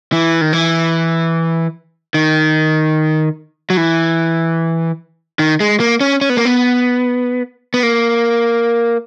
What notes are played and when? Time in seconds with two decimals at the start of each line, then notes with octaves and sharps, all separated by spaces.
0.12 E3
0.41 D#3
0.53 E3
2.14 D#3
3.70 F#3
3.77 E3
5.39 D#3
5.60 G#3
5.80 A#3
6.00 C#4
6.21 C#4
6.30 B3
6.37 A#3
6.45 B3
7.74 B3
7.83 A#3